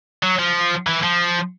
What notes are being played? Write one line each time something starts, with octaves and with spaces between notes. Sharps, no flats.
F#3
F3
E3
F3